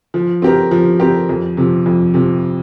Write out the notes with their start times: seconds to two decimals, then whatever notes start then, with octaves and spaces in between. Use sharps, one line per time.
0.14 F3
0.42 C4 G4 A#4
0.71 F3
1.00 C4 G4 A#4
1.29 F2
1.57 C3 F3
1.86 F2
2.14 C3 F3